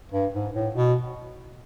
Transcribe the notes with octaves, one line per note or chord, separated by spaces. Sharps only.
G2
G#2
A2
B2